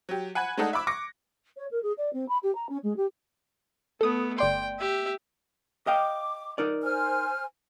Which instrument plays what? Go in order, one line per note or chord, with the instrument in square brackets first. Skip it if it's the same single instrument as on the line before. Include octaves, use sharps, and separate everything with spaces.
[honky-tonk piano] F#3 G4
F#5 G#5 B5 F#6 G#6
G#3 A3 D4 D#4 A4 F#5
E5 B5 D6 E6
C#6 D6 A#6 C#7
[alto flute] C#5
A#4
G#4
D5
C4
B5
G4
A#5
C#4
G#3
G4
[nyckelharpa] A3 B3 [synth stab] A4 D#6
[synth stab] G1 D5 C6 [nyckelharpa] G5
[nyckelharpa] G4 E5
[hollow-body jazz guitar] D#5 F5 G5 [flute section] D6
[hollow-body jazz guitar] D#4 A#4 D5
[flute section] C5 G#5 F6